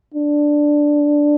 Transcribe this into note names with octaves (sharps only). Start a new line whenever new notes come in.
D4